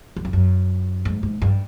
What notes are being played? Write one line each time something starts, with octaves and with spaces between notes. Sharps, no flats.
E2
F2
F#2
G#2
G#2
G2